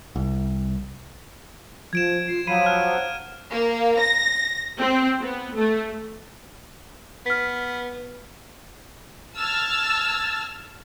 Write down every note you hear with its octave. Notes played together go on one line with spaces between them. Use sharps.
C2
F3 G#6 D7 E7
F4 C7
F3 F#3 F5 B5 D#7
F#5 F6
A#3
A#6
C4
B3
A3
B3 F6 B6
A5 E6 F6 G#6 A6